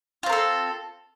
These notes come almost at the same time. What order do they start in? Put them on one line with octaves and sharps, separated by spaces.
F4 C4 A#4 A4